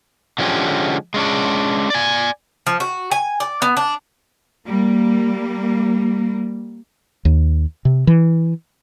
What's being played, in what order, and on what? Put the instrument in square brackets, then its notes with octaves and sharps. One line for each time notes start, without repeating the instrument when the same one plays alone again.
[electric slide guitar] D3 F3 G#3 C#4 G4
G#3 C#4 D4
D5 G#5
[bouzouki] F3
F#4
G#5
D5
B3
D4
[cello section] G3 A#3
[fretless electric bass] D#2
C3
E3